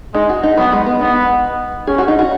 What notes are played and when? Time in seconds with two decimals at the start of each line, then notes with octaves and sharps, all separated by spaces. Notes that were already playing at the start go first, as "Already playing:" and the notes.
0.14 G#3 D#4
0.29 F#4
0.43 D#4
0.57 F#3 B3
0.72 G#3
0.86 B3
1.01 B3 D#4
1.87 C#4 G#4
1.98 F#4
2.08 D#4
2.19 F#4